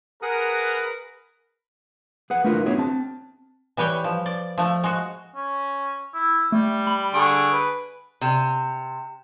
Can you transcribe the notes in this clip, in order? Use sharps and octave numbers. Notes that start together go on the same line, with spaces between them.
G#4 A#4 B4 F#5 D#6
G#4 B4 F#5
A3 D4 E4 F4 A#4 B4
B3 D4 E4 F#4 G#4 C#5
C4 A5
E3 G3 B4 C#5 G5
F3
D5
F3 A3
G#3 F#4
C#4
E4
G3 A3
B5
D3 G#4 C#6 D7
B4
C3